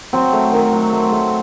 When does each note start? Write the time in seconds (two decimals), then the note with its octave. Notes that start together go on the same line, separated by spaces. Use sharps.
0.13 F#3 C4
0.33 A3
0.52 D#3
0.73 F#3
0.92 A3
1.12 A3